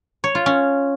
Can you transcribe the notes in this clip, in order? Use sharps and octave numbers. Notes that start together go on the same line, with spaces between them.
C#5
F4
C#4